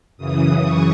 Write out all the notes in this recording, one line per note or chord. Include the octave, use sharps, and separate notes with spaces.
F#2 C#3 E3 D#6
C#6